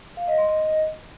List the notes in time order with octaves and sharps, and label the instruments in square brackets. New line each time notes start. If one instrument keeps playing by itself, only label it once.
[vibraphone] F5
D#5
C6
D#5